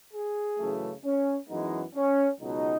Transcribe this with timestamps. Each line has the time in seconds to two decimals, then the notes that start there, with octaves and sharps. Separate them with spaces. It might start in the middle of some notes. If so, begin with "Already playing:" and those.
0.12 G#4
0.58 F#2 C#3 E3 A3
1.04 C#4
1.49 F#2 E3 G#3 B3 D#4
1.95 C#4
2.40 C#2 B2 F#3 D#4